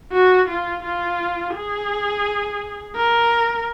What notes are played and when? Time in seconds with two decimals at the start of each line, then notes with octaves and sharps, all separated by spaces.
0.12 F#4
0.48 F4
0.83 F4
1.54 G#4
2.96 A#4